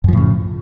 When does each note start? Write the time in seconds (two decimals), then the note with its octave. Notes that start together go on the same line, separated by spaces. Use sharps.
0.04 F#2
0.08 F3
0.13 A2
0.17 C#3